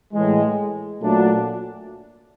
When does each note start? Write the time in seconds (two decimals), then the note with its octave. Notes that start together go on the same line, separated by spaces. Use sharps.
0.14 A2 E3 G#3
1.01 A#2 F#3 A3 D4 F#4